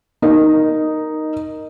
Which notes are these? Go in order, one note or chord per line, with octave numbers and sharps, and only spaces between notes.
D#4 A#4